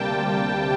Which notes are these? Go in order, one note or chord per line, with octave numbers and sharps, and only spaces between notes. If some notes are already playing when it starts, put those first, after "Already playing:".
Already playing: D2 C3 G3 A#3 G5 A5
C3
G3
D2